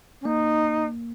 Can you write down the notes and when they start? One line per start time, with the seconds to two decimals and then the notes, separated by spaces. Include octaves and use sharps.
0.21 C#4
0.25 A#3 D#4